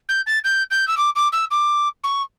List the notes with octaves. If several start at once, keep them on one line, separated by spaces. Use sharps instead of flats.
G6
A6
G6
G6
E6
D6
D6
E6
D6
C#6